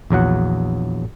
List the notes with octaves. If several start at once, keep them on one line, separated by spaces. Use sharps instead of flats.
A#1 E2 F#3 F#5